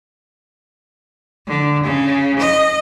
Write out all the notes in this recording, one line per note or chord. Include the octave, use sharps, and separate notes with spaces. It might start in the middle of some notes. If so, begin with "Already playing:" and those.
D3
C#3
D#5